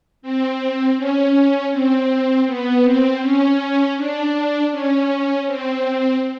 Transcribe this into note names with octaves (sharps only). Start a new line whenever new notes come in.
C4
C#4
C4
B3
C4
C#4
D4
C#4
C4